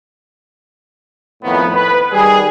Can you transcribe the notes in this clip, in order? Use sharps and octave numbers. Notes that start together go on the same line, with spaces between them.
F2 A2 D#3 B3
B4
D#3 G3 G#4